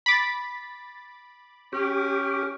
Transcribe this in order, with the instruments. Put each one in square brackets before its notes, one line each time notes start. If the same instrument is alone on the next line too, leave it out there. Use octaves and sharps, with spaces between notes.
[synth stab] B5 D6 A6
[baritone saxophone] C#4 [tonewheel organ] G4